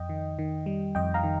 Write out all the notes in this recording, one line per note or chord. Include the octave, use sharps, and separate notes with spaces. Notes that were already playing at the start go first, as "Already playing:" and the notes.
Already playing: F2 D#5 G5
D#3
D#3
G3
F2 D#5 G5
F5 A#5
D#3